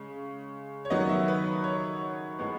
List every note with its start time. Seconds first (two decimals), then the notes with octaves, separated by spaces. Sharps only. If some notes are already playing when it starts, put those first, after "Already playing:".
Already playing: C#3 G#3
0.85 C#5
0.90 D#3 F#3 B3 D#5
1.09 E5
1.28 B4
1.64 C#5
2.39 A2 G#3 B3